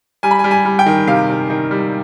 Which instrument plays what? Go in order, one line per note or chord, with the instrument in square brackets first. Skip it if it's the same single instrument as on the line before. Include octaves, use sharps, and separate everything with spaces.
[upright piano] G3 G#5
B5
G#5
G3
G#5
G3
G5
D#3
C3 F5
C3
D#3
G3